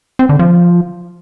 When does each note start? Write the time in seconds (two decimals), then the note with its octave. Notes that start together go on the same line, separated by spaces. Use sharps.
0.19 C4
0.29 D3
0.39 F3